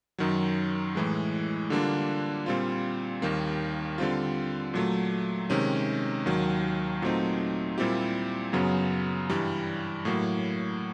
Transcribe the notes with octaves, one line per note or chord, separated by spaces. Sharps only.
F#2 D#3 F#3
A2 E3 G#3
D3 G3 A#3 D4 F4
A#2 G3 C4 F4
D#2 D#3 G3 A#3
D3 G3 C4 F4
A#2 F#3 A3
C3 D#3 G#3 C#4
D#2 D#3 F#3
A#2 F#3 A3 C4 D#4
A#2 G3 C4 E4 G4
F#2 C#3 F#3 B3
G2 E3 G3
A2 F#3 A#3